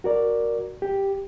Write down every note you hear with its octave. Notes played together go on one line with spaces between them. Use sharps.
F#4 A#4 D5
G4